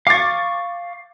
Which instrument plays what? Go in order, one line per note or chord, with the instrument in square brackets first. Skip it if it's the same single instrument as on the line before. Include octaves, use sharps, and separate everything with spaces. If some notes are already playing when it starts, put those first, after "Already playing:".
[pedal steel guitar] F5 C#6 [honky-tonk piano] D6 A6